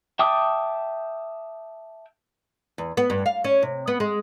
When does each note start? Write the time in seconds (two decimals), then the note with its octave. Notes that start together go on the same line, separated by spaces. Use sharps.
0.19 E5 G5 A5 D6 D#6
2.78 E2
2.97 B3
3.10 G2
3.26 F5
3.44 C#4
3.63 C3
3.88 B3
4.00 G#3